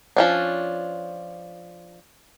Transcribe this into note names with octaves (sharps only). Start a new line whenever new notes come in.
F3 C#4 D4